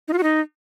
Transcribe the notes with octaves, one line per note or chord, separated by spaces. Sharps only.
D#4
F4
F#4
D#4